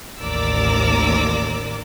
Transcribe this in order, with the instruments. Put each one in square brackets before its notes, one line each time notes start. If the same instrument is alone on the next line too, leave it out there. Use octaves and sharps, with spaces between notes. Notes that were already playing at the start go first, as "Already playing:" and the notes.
[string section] A1 D#2 A#4 D5 D6 E6